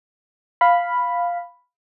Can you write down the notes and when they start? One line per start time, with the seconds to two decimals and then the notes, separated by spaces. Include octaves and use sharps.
0.61 F5 B5